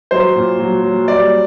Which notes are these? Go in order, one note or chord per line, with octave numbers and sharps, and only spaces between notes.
F#3 C5
A#2
F#3
F#3
G3 D5